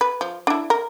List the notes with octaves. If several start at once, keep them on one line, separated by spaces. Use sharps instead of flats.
B4
F3
D4 E4
A#4